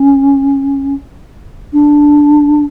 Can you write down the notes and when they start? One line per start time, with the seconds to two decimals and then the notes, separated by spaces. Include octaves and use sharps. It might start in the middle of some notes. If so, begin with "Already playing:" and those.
Already playing: C#4
1.73 D4